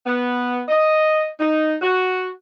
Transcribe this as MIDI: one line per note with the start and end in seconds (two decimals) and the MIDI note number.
0.06 0.62 59
0.69 1.28 75
1.40 1.74 63
1.82 2.29 66